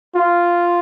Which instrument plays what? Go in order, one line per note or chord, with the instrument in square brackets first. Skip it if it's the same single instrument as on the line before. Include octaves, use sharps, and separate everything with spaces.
[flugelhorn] F4